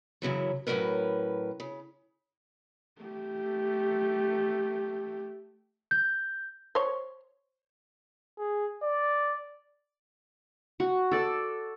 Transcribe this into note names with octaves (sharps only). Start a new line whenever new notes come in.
F#2 C#3 E3 F#3
A2 F#3 A#3 C#4 A#4 B4
C#3
A3 G4
G6
C5 C#5
G#4
D5
F#4
A4 D5